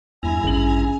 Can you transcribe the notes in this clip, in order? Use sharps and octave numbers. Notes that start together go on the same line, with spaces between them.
E2 G2 E4 G#5 A#5
A1 C#3 F#7